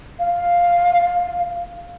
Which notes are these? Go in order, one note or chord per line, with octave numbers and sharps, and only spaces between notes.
F5